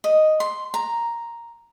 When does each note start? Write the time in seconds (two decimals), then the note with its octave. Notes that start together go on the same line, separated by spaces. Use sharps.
0.04 D#5
0.40 C6
0.74 A#5